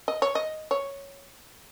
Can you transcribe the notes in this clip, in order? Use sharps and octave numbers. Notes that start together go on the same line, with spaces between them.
D#5
C#5
D#5
C#5